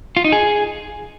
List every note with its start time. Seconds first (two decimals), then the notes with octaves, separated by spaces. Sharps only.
0.17 F4
0.24 D#4
0.32 G#4